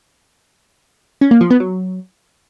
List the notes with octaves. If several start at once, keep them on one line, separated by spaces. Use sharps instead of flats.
C#4
A#3
F3
B3
F#3